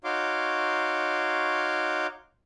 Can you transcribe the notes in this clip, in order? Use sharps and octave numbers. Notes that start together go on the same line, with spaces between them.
D#4 F#4 C#5 F5 C6 D6